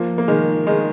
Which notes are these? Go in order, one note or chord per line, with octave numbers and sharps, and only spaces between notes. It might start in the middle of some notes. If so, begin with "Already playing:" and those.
Already playing: F3 A#3
A#3
D#3 G#3
D#3 G#3